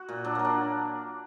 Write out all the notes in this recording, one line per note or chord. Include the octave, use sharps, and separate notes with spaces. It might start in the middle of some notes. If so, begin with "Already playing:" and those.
Already playing: F#4
A#2
F#3 D4
F#3 A#3
D4